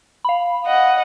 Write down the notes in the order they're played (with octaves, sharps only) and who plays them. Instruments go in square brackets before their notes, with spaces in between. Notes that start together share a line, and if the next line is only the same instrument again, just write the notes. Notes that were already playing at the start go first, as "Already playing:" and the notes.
[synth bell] F5 B5
[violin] D#5 F#5